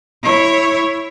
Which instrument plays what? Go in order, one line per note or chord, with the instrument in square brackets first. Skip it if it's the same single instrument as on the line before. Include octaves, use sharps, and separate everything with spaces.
[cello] E4 C#5